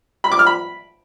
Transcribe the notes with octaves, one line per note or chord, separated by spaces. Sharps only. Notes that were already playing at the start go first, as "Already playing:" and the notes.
B5
D6
F6
B5